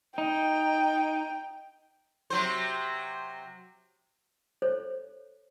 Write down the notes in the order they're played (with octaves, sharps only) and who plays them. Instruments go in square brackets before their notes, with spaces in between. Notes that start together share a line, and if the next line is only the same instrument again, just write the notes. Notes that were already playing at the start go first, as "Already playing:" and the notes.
[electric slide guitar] D#4 [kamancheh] G5
[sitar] C3 F#3 C5
[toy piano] A4 C5 C#5